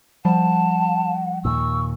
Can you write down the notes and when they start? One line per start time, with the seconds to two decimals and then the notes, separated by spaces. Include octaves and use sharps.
0.25 F3 G3 F#5 A5
1.45 D#2 A#2 C#6 E6